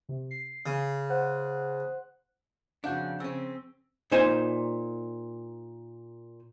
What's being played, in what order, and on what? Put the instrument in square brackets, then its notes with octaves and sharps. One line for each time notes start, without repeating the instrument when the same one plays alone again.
[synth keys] C3
C7
[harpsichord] C#3
[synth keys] C5 F#5 F#6
[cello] F2 C#3 [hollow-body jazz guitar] D4 F#4 [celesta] F5 F#5 G6
[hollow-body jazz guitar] C#3 C#4 [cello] C4 [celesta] E6
[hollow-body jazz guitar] A#2 D#4 C5 G#5